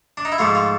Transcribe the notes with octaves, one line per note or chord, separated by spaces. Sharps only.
D4
D#4
E4
G#2 F3 A3 F4
F4